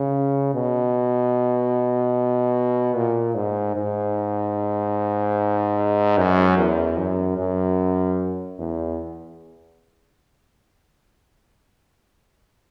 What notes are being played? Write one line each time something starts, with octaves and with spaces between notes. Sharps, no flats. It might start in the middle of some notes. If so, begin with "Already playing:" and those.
Already playing: C#3
B2
A#2
G#2
G#2
F#2
E2
F#2
F#2
E2